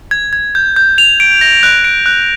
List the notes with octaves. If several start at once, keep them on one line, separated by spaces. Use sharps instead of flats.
G#6
G#6
G6
G6
F7
D7
A#6
F#6
D7
F#6